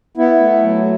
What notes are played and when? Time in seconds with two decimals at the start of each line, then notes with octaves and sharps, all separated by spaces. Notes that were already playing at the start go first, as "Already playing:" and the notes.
0.17 B3 E4
0.40 A3
0.63 F#3